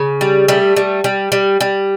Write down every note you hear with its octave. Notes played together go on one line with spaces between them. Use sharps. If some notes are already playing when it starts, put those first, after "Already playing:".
Already playing: C#3
G3
G3 A3
G3
G3
G3
G3